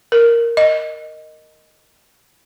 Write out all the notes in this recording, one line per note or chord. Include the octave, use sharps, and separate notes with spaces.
A#4
D#5